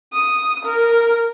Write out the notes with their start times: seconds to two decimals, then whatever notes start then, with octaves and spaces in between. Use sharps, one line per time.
0.13 D#6
0.65 A#4